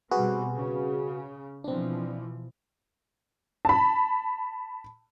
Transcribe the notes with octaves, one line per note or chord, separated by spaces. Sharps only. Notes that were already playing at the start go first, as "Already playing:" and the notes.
B2 G3 C4 F#4 G#4 B4
C#3
B2 E3 F3 C4 D4
A5 B5